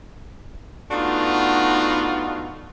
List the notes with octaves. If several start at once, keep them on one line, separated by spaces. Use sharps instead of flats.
A3 B3 D4 D#4 F4 F#4